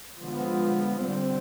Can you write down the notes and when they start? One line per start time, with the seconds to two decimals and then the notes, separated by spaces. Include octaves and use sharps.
0.21 D3 F3 G#3 B3
0.99 D3 G3 C4